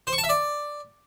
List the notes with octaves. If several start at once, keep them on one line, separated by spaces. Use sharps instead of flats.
C5
C#6
A5
E5
D5